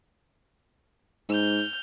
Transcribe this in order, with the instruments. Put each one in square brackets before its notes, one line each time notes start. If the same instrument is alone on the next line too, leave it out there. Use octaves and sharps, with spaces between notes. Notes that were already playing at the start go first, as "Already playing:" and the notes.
[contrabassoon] G#2 [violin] F6 G6